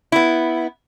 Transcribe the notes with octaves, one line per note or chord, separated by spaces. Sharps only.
B3 E4